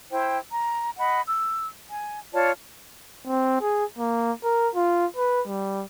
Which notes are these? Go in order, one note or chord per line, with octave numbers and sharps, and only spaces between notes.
E4 C5 G5
A#5
D#5 F#5 B5
E6
G#5
F4 C#5 D5 A5
C4
G#4
A#3
A#4
F4
B4
G3